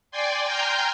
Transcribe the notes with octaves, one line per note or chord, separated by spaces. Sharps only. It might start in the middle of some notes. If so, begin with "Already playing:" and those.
D5 G5 G#5 C6
G5 G#5 A#5 C6 F6 G6